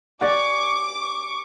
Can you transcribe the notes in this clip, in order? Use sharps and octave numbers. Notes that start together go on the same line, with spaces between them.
G4 D5 F#5 G#5 C#6 D6
C#6